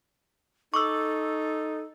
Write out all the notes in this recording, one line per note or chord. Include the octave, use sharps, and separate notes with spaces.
D#4 A4 C#6 D6 E6